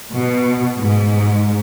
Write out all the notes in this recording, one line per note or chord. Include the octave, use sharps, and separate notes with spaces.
B2
G#2